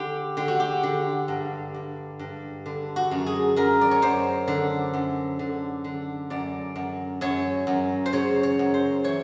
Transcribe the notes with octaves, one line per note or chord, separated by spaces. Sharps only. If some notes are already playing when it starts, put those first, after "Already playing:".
Already playing: D3 G4
D3 G4
F#4
G4
D3
G2
G2
G2
D3
F#4
F#2
G#4
F#2 A#4
D5
C#5
F#2 C5
D3
F#2
D3
D3
F#2 D5
F#2
F#2 C#5
F#2
C5
C#3 C#5
C#5
F#2
C5
E3 C#5